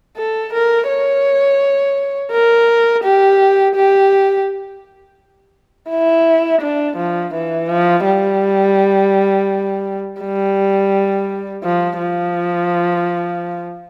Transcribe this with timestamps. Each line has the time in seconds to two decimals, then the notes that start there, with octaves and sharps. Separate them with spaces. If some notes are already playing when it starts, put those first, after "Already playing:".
0.17 A4
0.53 A#4
0.88 C#5
2.32 A#4
3.04 G4
3.75 G4
5.90 E4
6.61 D4
6.97 F3
7.34 E3
7.69 F3
8.05 G3
10.20 G3
11.64 F3
11.99 F3